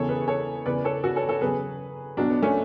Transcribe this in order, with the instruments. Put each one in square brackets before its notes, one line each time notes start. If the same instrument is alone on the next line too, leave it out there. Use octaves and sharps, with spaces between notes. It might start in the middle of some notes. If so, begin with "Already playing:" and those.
Already playing: [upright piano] E1 E2 C#3 E3 A4 C#5
G#4 B4
A4 C#5
E1 E2 C#3 E3 B4 D5
A4 C#5
F#4 A4
A4 C#5
A4 C#5
E2 C#3 F#3 G#4 B4
B1 B2 F#3 D4 F#4
B3
A3 C#4